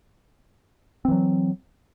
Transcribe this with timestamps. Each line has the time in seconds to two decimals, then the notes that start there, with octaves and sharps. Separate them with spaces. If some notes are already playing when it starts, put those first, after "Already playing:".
1.05 C4
1.08 E3
1.12 F#3